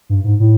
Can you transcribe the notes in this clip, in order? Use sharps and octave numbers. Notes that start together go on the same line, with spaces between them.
G2
G#2
A2